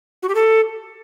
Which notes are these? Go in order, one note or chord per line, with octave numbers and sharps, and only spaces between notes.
F#4
G4
A4